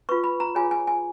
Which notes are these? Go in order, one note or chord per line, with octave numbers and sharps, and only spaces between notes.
F4 B4 C#6
B5
A#5
F4 G#4 C#5 G#5
G#5
G#5